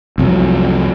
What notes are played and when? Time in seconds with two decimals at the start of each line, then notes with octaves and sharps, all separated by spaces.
0.18 C2 F2 F#3